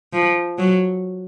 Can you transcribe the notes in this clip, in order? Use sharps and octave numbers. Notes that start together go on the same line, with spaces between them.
F3
F#3